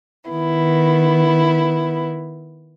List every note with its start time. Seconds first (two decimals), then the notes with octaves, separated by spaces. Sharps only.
0.29 D#3 B3 E4